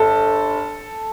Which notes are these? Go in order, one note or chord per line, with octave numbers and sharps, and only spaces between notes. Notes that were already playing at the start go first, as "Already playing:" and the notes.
Already playing: G1 A4